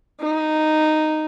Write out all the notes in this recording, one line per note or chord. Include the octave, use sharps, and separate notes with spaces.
D#4